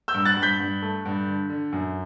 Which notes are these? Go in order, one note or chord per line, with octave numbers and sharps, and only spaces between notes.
E6 G6
G2
F#6 A6
G2
G6 B6
G2
A3
G2
D3
D3
F#2